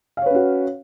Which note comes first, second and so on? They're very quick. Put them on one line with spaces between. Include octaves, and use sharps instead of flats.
F5 C#5 B4 C#4 F#4